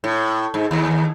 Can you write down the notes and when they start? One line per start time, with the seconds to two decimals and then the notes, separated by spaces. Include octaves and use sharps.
0.04 A2
0.54 G#2
0.71 D#2